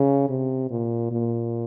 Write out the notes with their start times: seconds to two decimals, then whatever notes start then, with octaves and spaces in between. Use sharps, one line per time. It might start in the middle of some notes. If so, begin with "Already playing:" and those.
Already playing: C#3
0.29 C3
0.71 A#2
1.11 A#2